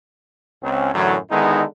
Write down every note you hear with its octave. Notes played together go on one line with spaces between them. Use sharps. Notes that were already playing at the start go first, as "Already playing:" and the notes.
C#2 C4 C#4
F#2 A2 D3 E3 F#3
D3 D#3 G#3 B3 D#4 E4